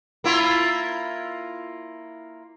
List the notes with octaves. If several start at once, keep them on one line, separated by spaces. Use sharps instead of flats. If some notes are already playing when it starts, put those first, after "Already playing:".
A#3 E4 F4